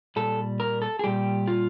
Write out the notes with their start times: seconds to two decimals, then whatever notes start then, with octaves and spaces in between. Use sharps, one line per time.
0.16 A#2 G3 A4
0.60 A#4
0.82 A4
0.99 G#4
1.04 A#2 G3 G4
1.48 F4